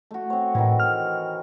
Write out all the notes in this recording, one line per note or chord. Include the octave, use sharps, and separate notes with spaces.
A3 F#4
C4 C#5
A2 D#3 E3
F6